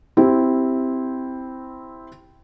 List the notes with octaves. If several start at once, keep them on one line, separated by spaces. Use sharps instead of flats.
C4 E4 G4